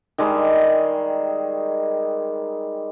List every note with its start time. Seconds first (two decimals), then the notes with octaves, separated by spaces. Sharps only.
0.18 D#3 G3 G#3